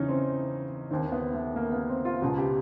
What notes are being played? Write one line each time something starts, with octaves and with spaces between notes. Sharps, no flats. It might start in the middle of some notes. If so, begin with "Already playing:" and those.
Already playing: E2 C#3 E3 C#4 D#4
C4
D#2 D#3 C4
B3
A3
A#3
B3
C4
F4
C#2 B2 F#4
G4